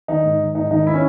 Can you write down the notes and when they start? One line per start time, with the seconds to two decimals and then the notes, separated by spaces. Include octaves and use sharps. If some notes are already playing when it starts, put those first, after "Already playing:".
0.08 D#3 D#4
0.23 G#2
0.40 D#3
0.55 G#2 D#4
0.71 D#3 D#4
0.87 E4
0.94 C#4